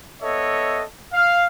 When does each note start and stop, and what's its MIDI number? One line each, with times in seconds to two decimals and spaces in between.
0.22 0.83 59
0.22 0.83 69
0.22 0.83 73
0.22 0.83 75
0.22 0.83 76
1.14 1.47 77